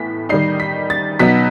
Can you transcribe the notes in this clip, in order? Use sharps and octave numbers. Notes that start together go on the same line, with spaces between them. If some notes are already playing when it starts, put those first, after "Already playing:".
Already playing: A2 E3 B3 B6
D#3 G3 D#4 C7
B6
A6
B2 F#3 B3 D#4 B6